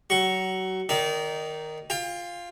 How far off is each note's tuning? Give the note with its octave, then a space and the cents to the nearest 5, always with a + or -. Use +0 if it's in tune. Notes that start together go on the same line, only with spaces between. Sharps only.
F#3 +25 C#6 +0
D#3 -5 D#4 +0 D5 -35
F4 +0 G5 +35